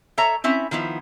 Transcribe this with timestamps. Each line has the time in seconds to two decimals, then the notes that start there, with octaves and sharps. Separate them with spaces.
0.18 A4 C#5 E5 A#5
0.44 C4 C#4 E4 E5
0.71 D#3 F3 B3 E4